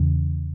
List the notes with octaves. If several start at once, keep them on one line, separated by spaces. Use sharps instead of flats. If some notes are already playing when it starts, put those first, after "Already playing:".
Already playing: E2 C#3